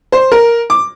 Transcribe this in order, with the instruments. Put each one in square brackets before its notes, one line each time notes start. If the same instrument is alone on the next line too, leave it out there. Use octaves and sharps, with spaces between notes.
[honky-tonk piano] C5
A#4
D6